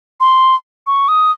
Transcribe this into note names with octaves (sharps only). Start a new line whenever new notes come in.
C6
C#6
D#6